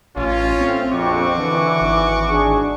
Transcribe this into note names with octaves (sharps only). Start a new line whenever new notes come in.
A1 C#4 F4
A3 C4
A#1 F2 F#4 C#6 D6
D3 E3
G#1
D4 G#4